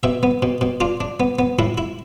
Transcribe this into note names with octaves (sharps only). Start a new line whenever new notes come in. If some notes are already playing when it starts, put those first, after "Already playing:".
B2 E5
B3
B2
B2
D4 F4
D4
B3
B3
A2 E4
E4